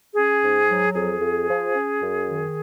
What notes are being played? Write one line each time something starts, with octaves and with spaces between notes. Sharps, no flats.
C#4 G#4
G#2
F#3
F2 G#4
F2
F3
C#4
F#2
D#3